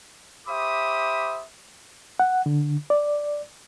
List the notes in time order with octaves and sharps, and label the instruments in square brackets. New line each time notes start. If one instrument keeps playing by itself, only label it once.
[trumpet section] G4 C5 E5 B5 D6 D#6
[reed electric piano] F#5
D3
D5